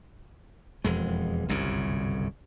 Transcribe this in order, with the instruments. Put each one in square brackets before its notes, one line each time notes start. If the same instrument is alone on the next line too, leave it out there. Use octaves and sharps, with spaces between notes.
[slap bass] E1 F2 G#3
G1 C2 F#2 C#3